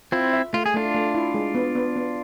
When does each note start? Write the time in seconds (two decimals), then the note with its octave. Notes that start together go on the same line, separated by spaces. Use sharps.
0.12 C4 E4 F4
0.33 E5
0.53 A3 F4
0.66 G#4
0.74 A3 D4 F4
0.95 A3
1.14 E4
1.34 G#3
1.55 B3
1.75 B3
1.96 B3